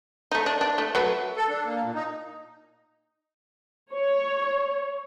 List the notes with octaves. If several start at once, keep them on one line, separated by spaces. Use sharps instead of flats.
A3 D#4
D4
D4
A3
F#3 A3 B4
A4
D4
A#3
A#2
D#4
C#5